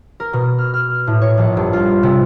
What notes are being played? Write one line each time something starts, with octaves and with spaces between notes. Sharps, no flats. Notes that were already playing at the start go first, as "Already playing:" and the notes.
A#4
B2
F6
F6
A2
C#5
A#1
G2
F4
C3